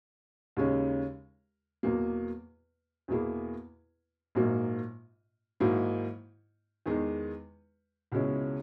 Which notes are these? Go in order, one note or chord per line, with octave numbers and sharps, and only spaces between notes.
D#2 C#3 G#3 C#4
E2 B2 F#3 A#3
E2 B2 A#3 E4 G#4
A#1 G#2 F#3 A#3
G#2 D#3 F#3 A#3 E4
E2 D#3 G#3
C#2 B2 G#3 C#4 E4